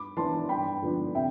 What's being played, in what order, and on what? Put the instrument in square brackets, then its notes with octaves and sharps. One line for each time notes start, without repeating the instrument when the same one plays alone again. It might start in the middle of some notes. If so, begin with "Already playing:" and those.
Already playing: [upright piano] G2 B5 D6
E3 B3 D4 A5 C6
G2 G5 B5
D3 F3 B3 D4
C3 E5 G5